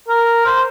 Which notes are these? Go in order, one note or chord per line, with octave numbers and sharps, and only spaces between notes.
A#4
C5